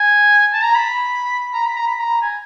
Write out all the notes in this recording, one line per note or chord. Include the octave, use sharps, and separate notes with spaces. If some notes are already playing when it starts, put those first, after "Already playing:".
Already playing: G#5
A5
A#5
B5
A#5
B5
A#5
B5
A#5
G#5